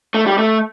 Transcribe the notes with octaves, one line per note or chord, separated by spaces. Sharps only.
A3
G3
A3